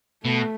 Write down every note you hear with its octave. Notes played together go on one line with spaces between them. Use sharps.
B2 A3